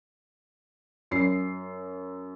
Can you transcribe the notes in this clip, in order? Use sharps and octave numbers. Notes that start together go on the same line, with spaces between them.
F#2 C7